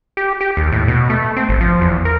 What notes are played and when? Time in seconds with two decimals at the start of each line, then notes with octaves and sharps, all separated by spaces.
0.17 G4
0.41 G4
0.57 D#2
0.72 A2
0.88 B2
1.10 A3
1.36 C4
1.49 G1
1.61 F3
1.81 E2
2.05 A#4